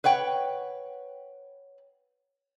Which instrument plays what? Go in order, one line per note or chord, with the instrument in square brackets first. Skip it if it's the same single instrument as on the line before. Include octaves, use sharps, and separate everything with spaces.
[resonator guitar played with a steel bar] B4 C#5 F#5 G5